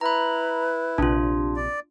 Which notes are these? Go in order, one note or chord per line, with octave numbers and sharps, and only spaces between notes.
E4 B4 A#5 B5
A#1 C3 D4 F4
D5